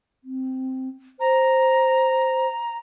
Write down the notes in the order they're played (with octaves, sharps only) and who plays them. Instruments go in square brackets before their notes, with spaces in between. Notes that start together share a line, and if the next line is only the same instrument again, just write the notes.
[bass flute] C4
[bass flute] C5 [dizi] A#5